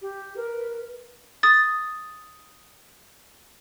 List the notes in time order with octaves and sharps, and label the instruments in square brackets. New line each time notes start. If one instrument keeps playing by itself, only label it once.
[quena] G4
[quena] A#4 [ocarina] B4
[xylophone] D#6 A6